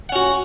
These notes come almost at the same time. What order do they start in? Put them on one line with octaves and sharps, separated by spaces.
F#5 C#4 F#4